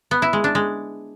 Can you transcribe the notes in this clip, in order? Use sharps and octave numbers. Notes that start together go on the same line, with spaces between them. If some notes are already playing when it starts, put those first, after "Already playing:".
B3
E4
G#3
D4
G#3